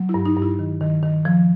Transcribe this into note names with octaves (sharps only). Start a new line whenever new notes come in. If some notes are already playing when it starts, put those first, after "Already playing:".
Already playing: F#3
E4
G2
D#4
G2
E4
D#3
D#3
D#3
F3